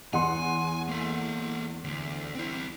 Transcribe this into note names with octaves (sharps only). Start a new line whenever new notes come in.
E2 F#5 G#5 C6
A#3 A4
D2
C4 E4